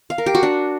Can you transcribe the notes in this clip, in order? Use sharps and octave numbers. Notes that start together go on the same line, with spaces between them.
F5
A#4
G4
F#4
D4